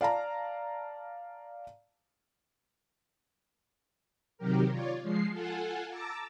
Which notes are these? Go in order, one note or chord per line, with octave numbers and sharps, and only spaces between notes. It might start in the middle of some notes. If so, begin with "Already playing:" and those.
D5 F5 A5 A#5
C3 D#3 F#3 G4 A#4
F4 C#5 D5
F3 G#3 C7
F4 A4 F#5 G#5
A5 A#5 D6 E6 A6